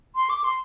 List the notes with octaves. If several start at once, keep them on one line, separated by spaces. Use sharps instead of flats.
C6
D6
C6